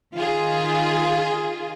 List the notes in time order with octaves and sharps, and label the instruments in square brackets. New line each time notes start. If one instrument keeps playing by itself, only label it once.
[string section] D#3 F4 G#4